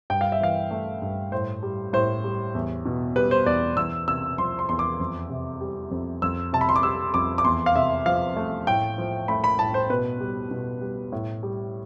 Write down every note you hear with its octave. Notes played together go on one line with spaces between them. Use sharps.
G2 G5
F5
E5
E3 F5
A3
G2
A2 C5
G3
A2 C5
G3
E2
B2
G3 B4
C5
E2 D5
E2 E6
C3 E6
F3 C6
C6
E2 C6
D6
F2
C3
G3
F2
F2 E6
C3 A5
B5
C6
D6
G3 E6
F2 D6
D6
E2 C6
F5
C3 E5
F3 F5
A3
A2 G5
F3
A3 B5
B5
A2 A5
C5
B2 B4
G3
B2
G3
A2
G3